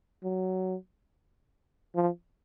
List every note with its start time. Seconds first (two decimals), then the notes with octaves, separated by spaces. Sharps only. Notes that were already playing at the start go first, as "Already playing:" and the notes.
0.24 F#3
1.95 F3